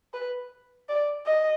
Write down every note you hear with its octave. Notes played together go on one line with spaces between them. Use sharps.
B4
D5
D#5